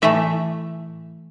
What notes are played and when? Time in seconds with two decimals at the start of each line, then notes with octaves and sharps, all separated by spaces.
0.02 A2 E3 A3 E5